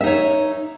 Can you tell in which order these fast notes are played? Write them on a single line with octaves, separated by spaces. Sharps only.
E5 D#4 C#5